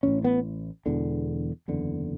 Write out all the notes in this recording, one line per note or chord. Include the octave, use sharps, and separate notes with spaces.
A1 A2 C#4
B3
E1 E2 D3
F#1 E2 D3